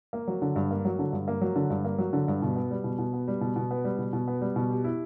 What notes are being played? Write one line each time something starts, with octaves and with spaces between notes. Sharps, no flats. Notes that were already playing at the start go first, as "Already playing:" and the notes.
A#3
F#3
D3
G2
A#3
F#3
D3
G2
A#3
F#3
D3
G2
A#3
F#3
D3
G2
B2
B3
G3
B2
B2
B3
G3
B2
B2
B3
G3
B2
B2
B3
G3
B2
G4
E4